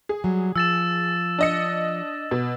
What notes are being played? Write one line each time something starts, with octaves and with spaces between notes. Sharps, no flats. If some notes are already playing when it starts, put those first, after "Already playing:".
G#4
F#3 G3
F3 E6 A6 E7
D4 D#5 C#7
B2